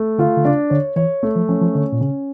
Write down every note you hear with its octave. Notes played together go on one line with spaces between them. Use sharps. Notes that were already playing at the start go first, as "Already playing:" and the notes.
Already playing: A3
D3 F4
D3
C#3 D4
D3 C#5
E3 C#5
A3
F3
F3 C#4
F3
D3 C#5
A#2
C#3 C#4